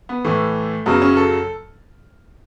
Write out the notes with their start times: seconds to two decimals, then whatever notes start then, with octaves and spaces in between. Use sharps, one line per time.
0.09 B3
0.24 A2 E3 A3
0.86 F#2 C#3 F#3 B3
1.02 C#4
1.17 A4